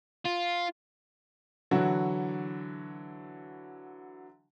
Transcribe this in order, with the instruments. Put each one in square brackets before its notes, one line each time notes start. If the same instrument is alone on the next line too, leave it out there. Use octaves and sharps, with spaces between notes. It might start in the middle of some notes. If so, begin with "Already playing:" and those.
[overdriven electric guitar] F4
[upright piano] D3 E3 F#3 E4 F#4